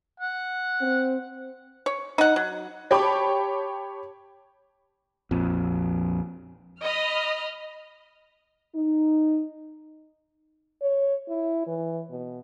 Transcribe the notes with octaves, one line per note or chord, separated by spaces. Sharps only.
F#5
C4
C#5
D#4 F#5
F#3
G4 C#5 G5 A5 B5 D6
A#1 F2
D#5 B5 F6
D#4
C#5
E4
E3
B2